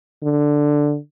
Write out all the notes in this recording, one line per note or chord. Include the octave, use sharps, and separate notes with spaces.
D3